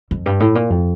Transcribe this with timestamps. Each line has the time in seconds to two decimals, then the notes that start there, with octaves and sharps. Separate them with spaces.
0.11 F2
0.26 G2
0.40 A2
0.55 A#2
0.70 F2